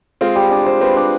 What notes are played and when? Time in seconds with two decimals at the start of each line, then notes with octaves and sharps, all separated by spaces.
0.21 G#3 C4 F4
0.36 G3
0.51 D4
0.66 C5
0.81 G#3 C4 B4
0.96 D4